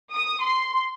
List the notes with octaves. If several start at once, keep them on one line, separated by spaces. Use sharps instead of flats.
D#6
C6